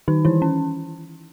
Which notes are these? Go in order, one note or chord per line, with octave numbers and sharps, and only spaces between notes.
D#3 D#4
E3 E4
C#4